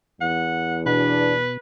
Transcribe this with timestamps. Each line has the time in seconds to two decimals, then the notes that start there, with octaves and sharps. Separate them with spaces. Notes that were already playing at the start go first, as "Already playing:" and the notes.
0.21 E2 F#5
0.86 B2 D4 B4